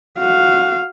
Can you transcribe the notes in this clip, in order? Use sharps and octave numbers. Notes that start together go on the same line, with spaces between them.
F#4 F5